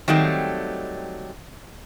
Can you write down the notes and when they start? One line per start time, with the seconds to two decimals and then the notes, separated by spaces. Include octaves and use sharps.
0.08 D#3 F#3 G3 A3 C4